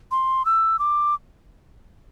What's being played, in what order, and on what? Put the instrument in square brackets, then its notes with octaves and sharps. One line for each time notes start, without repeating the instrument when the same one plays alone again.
[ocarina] C6
E6
D6